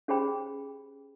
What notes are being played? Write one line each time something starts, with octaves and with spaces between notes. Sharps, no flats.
C#4 G4 G#4 C5 G5 B5